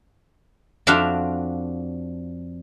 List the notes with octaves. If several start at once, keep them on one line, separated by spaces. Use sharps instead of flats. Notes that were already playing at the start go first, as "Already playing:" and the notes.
F2 C4 D4 F#4 E5 F5